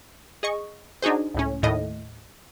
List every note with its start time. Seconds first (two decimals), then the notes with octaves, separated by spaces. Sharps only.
0.43 G#4 D#5 C#6
1.02 D4 D#4 F#4 G#4 C5
1.34 C#2 A2 C#4
1.62 D#2 A2 D#5